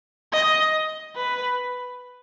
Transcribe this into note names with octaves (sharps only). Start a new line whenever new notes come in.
D#5
B4